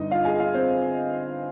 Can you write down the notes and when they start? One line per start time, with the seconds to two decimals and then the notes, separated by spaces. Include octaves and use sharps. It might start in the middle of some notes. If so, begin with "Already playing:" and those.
Already playing: G1 G2 D3 D#4 D#5
0.11 F4 F5
0.25 G#4 G#5
0.40 F4 F5
0.54 C4 C5